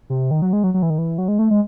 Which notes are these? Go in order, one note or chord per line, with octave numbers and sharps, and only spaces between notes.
C3
D#3
F#3
G#3
F#3
F#3
E3
D#3
E3
F#3
G#3
A3
G#3